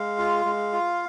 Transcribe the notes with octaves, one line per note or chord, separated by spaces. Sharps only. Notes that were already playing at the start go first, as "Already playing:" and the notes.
Already playing: G#3 F5
F4
G#3
F4